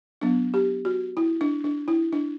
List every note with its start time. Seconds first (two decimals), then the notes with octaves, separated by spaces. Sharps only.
0.21 F#3 B3 D4
0.54 G4
0.85 F#4
1.17 E4
1.41 D4
1.64 D4
1.88 E4
2.13 D4